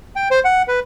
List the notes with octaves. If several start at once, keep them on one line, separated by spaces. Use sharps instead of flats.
G5
C5
F#5
B4